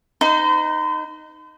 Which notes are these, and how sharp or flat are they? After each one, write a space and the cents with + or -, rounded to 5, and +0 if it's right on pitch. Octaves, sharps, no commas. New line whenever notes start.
D#4 +0 C5 -45